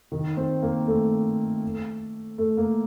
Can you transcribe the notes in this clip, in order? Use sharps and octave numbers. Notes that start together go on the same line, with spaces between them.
D#3
C4
A#3
A3
A3
A#3